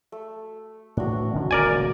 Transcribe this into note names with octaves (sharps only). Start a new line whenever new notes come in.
A3
A2 E3 D4 F#4
D3 F3 C#4
D#1 C#2 A#4 D5 G#5